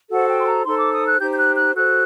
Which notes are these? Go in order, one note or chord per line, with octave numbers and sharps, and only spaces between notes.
F#4 A4 C5 F#5
G5
C6
A#5
D#4 A4 C5 C6
D6
D#6
F#6
D#4 G4 C5 G6
G6
F#6
F#6
F#4 A4 C5 F#6